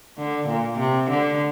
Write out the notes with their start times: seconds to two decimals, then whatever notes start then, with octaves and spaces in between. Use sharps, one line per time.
0.18 D3
0.48 A#2
0.79 C3
1.10 D3